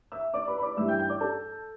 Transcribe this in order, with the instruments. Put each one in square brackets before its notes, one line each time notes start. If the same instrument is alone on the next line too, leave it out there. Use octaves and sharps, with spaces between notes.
[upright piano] E5 E6
D5 D6
B4 B5
B5
D5 D6
G2 E3 E5 E6
G5 G6
G5 G6
D5 D6
A4 A5